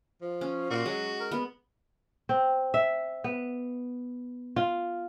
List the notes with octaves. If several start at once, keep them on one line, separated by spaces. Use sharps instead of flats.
F3
C#4
A#2 F#4
F#3 G#3
A#4
B3
C4
E5
B3
F4